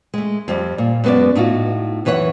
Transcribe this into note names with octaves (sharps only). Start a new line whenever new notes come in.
G#3 A3
F2 G3
A#2
F#2 G#3 B3 F#4 D5
A2 D#4 F4 F#4
F#2 E3 B4 C#5 F#5